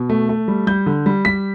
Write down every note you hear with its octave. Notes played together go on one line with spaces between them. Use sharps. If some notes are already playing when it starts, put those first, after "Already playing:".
Already playing: B2
A3
A3
G3
G3 G6
D3
G3
G3 B6